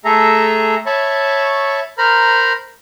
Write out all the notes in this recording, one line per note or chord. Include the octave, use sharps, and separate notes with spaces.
A3 G#4 A4 E5 A#5
C#5 E5 A5 B5 C#6
A#4 C5 A#5 B5 F6